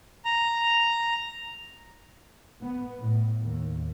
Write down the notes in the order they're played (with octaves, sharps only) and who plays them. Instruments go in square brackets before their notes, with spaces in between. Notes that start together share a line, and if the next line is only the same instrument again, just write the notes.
[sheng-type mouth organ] A#5
[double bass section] B3
A2
D#2